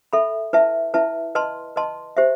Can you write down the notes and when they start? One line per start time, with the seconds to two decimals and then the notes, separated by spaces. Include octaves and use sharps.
0.13 A4 E5 B5
0.53 E4 B4 E5 A5
0.94 E4 B4 E5 A5
1.35 B4 D#5 A5 C6
1.76 B4 D#5 A5 C6
2.17 G4 C5 E5